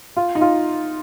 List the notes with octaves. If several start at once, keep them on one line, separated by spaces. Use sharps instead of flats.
F4
D#4
F4